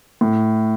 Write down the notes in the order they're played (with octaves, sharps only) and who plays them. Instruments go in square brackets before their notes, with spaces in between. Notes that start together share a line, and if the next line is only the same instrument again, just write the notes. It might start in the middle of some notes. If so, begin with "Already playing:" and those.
[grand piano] A2